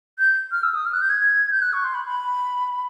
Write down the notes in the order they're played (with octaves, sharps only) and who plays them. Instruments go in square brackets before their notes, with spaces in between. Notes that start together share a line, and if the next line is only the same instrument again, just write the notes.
[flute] G6
F6
E6
D#6
F6
F#6
G6
G#6
G6
F#6
C#6
C6
B5
B5